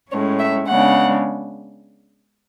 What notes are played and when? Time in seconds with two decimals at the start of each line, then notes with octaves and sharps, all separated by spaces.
0.11 A2 G#3 C#4 C#5
0.39 E5
0.68 C#3 G#3 B3 D4 F#5